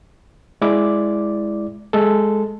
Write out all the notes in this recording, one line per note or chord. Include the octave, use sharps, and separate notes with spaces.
G#3 E4 D5 D6
G#3 A4